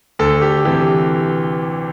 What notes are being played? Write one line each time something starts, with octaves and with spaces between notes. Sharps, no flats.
D2 A4
G4
C3 E3 G4